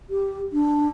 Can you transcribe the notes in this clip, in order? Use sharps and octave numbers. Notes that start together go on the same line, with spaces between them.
G4
D4